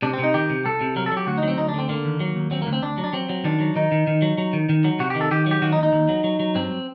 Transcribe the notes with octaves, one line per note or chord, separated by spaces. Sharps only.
C3 D4
C4
C3 D#4
D#3 G4
C3
C2 A4
C3
F#3 A#4
A4
F#3
G4
D2 F#4
D#4
F#3 C4
D2 D#4
D4
D3 C4
D3 A#3
D#2
F#3
D#2
F#3 C4
A#3
D2
C4
D2 D4
F#3
D4
F#3 C4
F#3
D#3 D4
F#3
D#3 D#4
D#3
D#3
F#3
F#3
D#3
D#3
F#3
C3 F#4
D#3 G4
A4
D#3 G4
F#3 G4
D#3 F#4
D#4
D#2
D#4
D#2
F#3
F#3
F#3
G2 C4